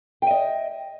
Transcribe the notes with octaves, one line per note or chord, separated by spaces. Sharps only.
D#5 E5 G5